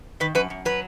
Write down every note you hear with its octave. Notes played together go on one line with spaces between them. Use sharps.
D#3 B4
F#2 B4
F#2
F#3 B4